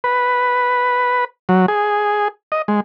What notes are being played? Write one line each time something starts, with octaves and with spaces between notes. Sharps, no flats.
B4
F#3
G#4
D#5
G#3